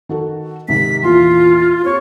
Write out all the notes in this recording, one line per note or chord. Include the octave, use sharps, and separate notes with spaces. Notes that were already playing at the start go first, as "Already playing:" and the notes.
D#3 F#4 A4
G#2 C3 D#3 B6
E2 A#2 F4 C6
D#2 C4 C#5 C#6